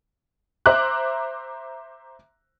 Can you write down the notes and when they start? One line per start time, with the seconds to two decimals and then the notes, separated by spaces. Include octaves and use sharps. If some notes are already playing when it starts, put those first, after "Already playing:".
0.66 C5 E5 A#5 D6 F#6